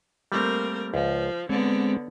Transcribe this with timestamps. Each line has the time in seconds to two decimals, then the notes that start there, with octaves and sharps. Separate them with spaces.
0.32 G3 A3 A#3 C4 A#4
0.94 C#2 F3
1.49 D3 G#3 B3 C4 C#5 D5